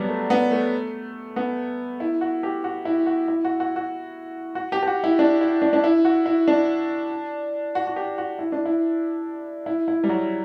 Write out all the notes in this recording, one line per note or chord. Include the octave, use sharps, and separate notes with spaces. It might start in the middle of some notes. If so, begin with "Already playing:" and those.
Already playing: F#3 G3 B3 D4
A3
B3
A3
B3
E4
F#4
G4
F#4
E4
F#4
E4
F#4
F#4
F#4
F#4
G4
G4
F#4
E4
D4
E4
D4
D4
E4
F#4
E4
D4
F#4
F#4
G4
F#4
E4
D4
E4
E4
E4
G3
F#3